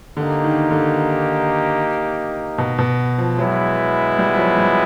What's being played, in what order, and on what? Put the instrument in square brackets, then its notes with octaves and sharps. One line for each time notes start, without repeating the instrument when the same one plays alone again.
[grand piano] D3 [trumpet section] A#3 D#4 G4
[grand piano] D#3
D3
B2
B2
F3
[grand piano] F#3 [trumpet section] G#3 B3 E4
[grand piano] G3
F3
F#3
G3